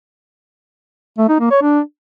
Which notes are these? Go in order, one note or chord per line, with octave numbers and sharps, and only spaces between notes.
A3
D#4
A#3
C#5
D4